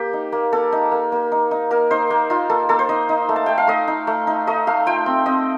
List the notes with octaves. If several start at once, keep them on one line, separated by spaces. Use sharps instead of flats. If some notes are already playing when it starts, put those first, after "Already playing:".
Already playing: A#3 G4
D#4
A#3
A#3 A4
D#4
A#3
A#3
D#4
D#4
A#3 A#4
D#4 C5
A#3
D#4 F4
A#3 A4
A#3 A4
C5
D#4 D#5
D#4
A3
A5
A3 G5
F5
A3 D#5
D#4
A3
D#4
A3 D#5
A3 F5
F4 G5
C4
C4 D#5